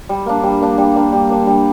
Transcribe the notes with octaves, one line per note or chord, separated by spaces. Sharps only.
G3
A#3 D4
G3
A#3 D4
G3
A#3 D4
G3
A#3 D4
G3